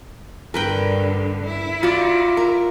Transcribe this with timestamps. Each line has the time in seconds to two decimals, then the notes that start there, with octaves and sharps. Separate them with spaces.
0.54 G2 D3 A#4 B4 G5
1.45 E4
1.83 F4 F#4 D5
2.37 A#4